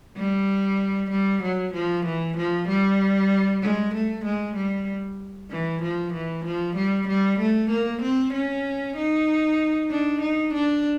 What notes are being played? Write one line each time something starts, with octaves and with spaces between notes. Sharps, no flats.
G3
G3
F#3
F3
E3
F3
G3
G#3
A3
G#3
G3
E3
F3
E3
F3
G3
G3
A3
A#3
C4
C#4
D#4
D4
D#4
D4